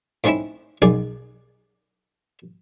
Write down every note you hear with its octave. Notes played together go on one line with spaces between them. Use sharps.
A2 C4 C#4 D#4 E4
B1 F#2 D#4 G#4 D5